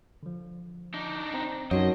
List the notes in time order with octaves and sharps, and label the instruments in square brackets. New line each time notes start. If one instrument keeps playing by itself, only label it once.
[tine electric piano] D3 F3
[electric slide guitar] D4 D#4
[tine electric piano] C4 C5 A#5
[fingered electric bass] F#2 [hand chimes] D#4 F#4 C#5 [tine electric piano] A#4 F#5 [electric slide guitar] D#5